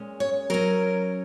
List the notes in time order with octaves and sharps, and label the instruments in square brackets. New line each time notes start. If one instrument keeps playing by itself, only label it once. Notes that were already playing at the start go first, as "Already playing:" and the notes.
Already playing: [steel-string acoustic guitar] A#2 G#3 C#4
C#5
F#3 C#4 A#4